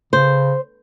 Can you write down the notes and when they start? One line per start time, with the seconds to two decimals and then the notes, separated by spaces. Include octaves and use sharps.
0.13 C#3 C5